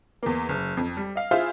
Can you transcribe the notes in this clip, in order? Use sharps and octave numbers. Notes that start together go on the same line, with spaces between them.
E2 A#3
F#1
F2
G3
D#5 F5
E4 F4 G#4 C5 E5 F5